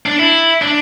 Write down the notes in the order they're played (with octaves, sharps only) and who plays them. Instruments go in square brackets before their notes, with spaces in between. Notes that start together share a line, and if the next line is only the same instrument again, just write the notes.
[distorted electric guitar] D4
E4
D4